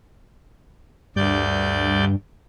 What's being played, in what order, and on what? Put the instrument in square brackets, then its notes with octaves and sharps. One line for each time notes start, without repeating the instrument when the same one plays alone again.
[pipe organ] D2 D5 G6 [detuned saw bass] G2